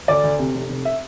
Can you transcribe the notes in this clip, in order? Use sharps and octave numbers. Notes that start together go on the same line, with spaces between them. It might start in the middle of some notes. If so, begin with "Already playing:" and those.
D2 D5
D2
C3
F1
F1
E5